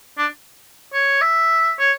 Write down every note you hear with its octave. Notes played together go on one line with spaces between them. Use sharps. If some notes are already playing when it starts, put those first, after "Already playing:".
D4
C#5
E5
C#5